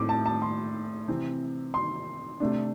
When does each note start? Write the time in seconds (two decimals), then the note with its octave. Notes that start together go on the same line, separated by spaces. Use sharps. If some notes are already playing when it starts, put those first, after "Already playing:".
Already playing: A2 A3 C4 D6
0.09 A5
0.26 A5
0.42 C6
1.08 C3 E3 C4
1.74 C6
2.40 C3 A3 D4